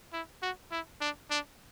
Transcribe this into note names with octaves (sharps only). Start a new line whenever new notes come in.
E4
F#4
E4
D4
D4